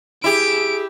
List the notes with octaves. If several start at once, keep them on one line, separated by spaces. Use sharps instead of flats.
E4 G4 G#4 D7